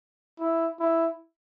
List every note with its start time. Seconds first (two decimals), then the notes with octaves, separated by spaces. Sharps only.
0.40 E4
0.79 E4